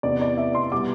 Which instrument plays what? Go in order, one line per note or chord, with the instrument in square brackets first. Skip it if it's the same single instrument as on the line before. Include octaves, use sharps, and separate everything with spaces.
[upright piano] E2 C3 E3 B3 D5
D5
E5
C6
B2 G3 B3 D6